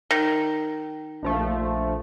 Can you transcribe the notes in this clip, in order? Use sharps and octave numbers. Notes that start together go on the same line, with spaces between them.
D#3
A#1 F3 A3